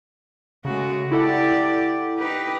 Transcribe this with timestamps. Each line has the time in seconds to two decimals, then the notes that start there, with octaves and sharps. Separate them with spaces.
0.65 C#3 G#3 A3 F#4
1.12 E4 G4 A4 D5 F#5
2.18 D#4 G4 B4